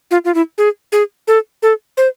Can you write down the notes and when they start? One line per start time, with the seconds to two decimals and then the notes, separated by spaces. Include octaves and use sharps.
0.11 F4
0.25 F4
0.34 E4
0.58 G#4
0.92 G#4
1.28 A4
1.63 A4
1.97 C5